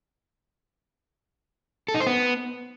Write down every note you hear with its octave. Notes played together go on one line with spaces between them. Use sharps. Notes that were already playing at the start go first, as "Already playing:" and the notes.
A4
D#4
C5
B3